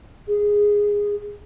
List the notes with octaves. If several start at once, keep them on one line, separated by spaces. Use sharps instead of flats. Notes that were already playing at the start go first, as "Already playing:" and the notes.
G#4